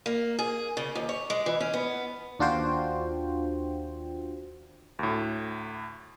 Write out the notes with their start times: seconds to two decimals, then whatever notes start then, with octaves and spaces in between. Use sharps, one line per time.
0.06 A#3
0.39 G#4
0.77 C#3
0.95 D#2
1.09 C#5
1.30 G#3
1.46 E3
1.60 C#4
1.73 B3
2.39 D#2 D4 F4 F#4 C5 G5
4.99 D2 A2